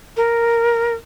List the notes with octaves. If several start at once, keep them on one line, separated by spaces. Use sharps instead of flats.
A#4